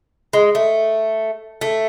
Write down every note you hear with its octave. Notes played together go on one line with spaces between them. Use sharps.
G#3
A3
A3